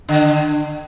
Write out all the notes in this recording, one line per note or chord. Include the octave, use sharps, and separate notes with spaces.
D3